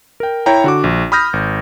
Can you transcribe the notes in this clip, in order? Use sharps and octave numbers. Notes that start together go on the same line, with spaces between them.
A#4 G5
E4 C#5 G5 A#5
D3 F#4 D6
A#1
B5 D#6 F6 G6 A#6
G#1